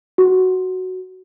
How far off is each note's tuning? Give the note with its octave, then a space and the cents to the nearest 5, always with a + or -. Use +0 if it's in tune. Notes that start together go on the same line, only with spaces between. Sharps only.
F#4 +5